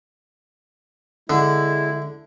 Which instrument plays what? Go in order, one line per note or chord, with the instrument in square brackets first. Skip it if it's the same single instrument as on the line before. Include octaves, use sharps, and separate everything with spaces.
[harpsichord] D3 [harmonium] G#3 E4